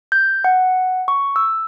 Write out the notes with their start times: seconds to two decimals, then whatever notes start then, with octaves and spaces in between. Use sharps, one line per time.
0.12 G6
0.44 F#5
1.08 C#6
1.36 E6